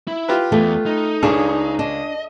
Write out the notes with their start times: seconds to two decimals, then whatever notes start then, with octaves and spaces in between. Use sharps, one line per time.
0.08 E4
0.28 F4 G4 B4
0.52 E2 A3
0.86 D#4
1.23 C#2 C#3 D4 G#4
1.79 D4 D#5